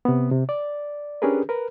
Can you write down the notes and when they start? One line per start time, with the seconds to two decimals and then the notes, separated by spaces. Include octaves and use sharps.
0.05 C3 B3
0.31 C3
0.49 D5
1.22 C#4 D4 G4 G#4 A#4 B4
1.49 A#4 B4